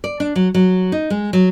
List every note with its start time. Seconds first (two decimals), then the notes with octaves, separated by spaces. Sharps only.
0.04 D5
0.20 D4
0.36 F#3
0.54 F#3
0.92 D#4
1.10 G#3
1.33 F#3